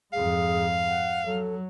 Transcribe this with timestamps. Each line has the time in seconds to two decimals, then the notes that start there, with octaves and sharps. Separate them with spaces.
0.13 F2 G#2 G#4 F5
0.87 F#5
1.26 F#3 A4